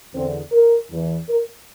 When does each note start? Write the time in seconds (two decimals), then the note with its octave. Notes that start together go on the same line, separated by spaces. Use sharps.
0.14 E2 D3 C4
0.52 A#4
0.90 E2 E3
1.29 A#4